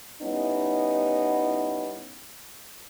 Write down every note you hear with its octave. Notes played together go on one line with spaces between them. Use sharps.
G3 B3 C#4 D#4 E4